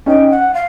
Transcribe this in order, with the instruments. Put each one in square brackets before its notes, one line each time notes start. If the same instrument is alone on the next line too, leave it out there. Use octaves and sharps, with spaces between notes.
[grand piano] C#4 D#4 [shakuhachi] G5
[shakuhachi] F#5
F5